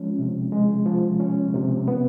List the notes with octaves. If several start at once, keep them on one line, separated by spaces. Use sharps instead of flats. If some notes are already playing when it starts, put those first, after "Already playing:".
Already playing: F3 G#3 C#4
C3
G#3
F3
C#4
C3
B3